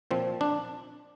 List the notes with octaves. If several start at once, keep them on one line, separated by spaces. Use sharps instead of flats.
A#2 F3 C4
D4